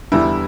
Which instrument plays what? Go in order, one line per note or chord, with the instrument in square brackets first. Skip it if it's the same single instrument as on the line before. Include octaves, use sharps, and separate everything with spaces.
[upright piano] E2 D3 G3 E4